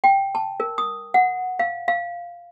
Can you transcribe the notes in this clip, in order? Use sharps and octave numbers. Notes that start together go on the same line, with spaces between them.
G5
A5
A#4
D#6
F#5
F5
F5